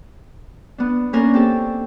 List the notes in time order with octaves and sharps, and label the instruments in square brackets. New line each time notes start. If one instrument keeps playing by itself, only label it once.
[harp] B3 D4
A#3 C#4 D4 A#4
C4 G4 A4